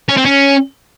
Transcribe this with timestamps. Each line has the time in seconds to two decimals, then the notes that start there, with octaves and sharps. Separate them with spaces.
0.09 C#4
0.17 C4
0.26 C#4